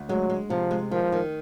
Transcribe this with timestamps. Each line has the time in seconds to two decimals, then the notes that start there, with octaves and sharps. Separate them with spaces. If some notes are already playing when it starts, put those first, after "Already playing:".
Already playing: D2
0.09 F#3 G#3
0.30 G#3
0.50 C3 F3
0.71 G#3
0.91 D#3 F3
1.12 D#3